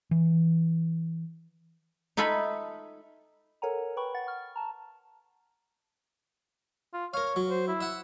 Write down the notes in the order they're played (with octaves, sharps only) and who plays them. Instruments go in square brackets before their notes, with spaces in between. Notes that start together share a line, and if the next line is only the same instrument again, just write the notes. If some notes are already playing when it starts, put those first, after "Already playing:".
[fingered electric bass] E3
[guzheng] D#4 F4 A4 E5 G#5 B5
[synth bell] A4 A#4 C#5 F#5 G#5 A#5
B4 G5 B5 C#6
F#5 A6
C#6 F6
A5 A#5
[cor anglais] F4
[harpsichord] A#4 F5 [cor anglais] C#5
[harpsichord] F#3
[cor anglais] C5
E4
[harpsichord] E5 F#5